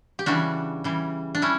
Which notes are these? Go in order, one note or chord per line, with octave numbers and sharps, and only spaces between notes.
G4
C#3 E3 G3 D4 F#4
C#3 E3 G3
D4
G3 C#4 E4